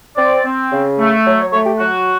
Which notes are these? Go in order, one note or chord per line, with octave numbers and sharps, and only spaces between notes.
C4 D5
C4
C#3
A3
F#3 C#5
C#5
A3 C#5
G4
F#3 F#4